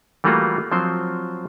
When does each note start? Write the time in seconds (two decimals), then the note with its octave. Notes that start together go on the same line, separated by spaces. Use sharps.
0.24 E3 G3 A3 A#3 F4 F#4
0.72 F3 F#3 C4 C5